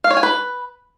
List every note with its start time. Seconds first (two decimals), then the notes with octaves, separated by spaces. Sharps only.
0.04 F5
0.11 C#5
0.17 G#5
0.23 B4